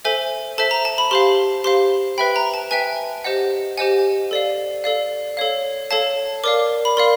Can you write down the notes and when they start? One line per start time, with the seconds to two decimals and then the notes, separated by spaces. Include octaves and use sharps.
0.05 A4 C5 E5 G#5
0.58 A4 C5 E5 A5
0.71 A#5
0.85 A5
0.98 B5
1.11 G4 C5 F5 C6
1.64 G4 C5 F5 C6
2.18 B4 E5 G5 B5
2.36 A#5
2.54 A5
2.71 B4 E5 G5 G#5
3.24 G4 C5 D#5 F#5
3.77 G4 C5 D#5 F#5 G#5
4.31 A4 D5 F5
4.84 A4 D5 F5
5.37 A4 C#5 F5
5.91 A4 C#5 F5 A5
6.44 A#4 D5 F5 D6
6.85 B5
6.97 A#4 D5 F5 C6